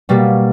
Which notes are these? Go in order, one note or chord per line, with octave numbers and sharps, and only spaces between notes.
B2 G3 A#3